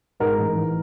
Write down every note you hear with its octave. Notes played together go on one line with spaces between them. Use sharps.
G#2 A#4
A1
E3